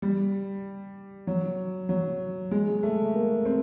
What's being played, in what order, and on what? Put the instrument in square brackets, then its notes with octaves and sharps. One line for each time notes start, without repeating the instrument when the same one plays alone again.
[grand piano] G3
F#3
F#3
G#3
A3
A#3
C4